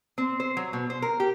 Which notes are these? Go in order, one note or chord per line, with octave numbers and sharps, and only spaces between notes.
C4
C5
F#3
B2
C5
A#4
G4